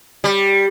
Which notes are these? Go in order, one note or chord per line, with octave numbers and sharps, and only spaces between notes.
G3